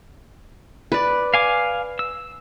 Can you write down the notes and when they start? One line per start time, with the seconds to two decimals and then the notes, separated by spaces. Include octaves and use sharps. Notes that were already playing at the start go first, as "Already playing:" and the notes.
0.92 B4 D5
1.34 F5 G#5 D6
1.99 E6